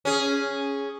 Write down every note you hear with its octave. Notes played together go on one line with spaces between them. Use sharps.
C#4 G#4